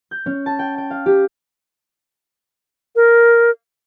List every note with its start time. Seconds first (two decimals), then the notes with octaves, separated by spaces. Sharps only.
0.11 G6
0.26 C#4
0.46 A5
0.59 G5
0.78 G5
0.91 F5
1.06 G4
2.96 A#4